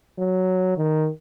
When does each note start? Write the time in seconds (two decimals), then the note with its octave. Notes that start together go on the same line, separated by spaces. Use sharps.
0.18 F#3
0.77 D#3